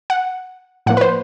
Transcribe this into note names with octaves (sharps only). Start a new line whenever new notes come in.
F#5
A2 F3 A#3 F#5
B4
C5